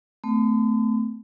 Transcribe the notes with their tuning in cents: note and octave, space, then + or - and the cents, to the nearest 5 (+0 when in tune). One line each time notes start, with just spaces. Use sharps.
A3 +0 C4 -45